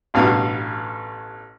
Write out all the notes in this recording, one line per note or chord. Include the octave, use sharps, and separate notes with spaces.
A1 G2 B2 B3 F5